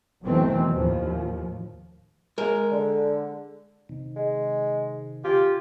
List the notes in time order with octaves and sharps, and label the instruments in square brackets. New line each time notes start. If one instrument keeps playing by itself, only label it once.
[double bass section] B2 D#3 E3 F#3 A3 C4
D#2 A2 F3
[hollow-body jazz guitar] G#3 A#4
[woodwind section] D3
[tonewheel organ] C3 D#3
[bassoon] G#3
[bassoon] F4 [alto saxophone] G4 [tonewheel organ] G#5